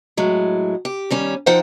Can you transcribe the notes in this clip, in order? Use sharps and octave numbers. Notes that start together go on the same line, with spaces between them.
A2 F#3 G#3
G4
D#3 G3 C#4
F3 D#4 C5 F#5 G5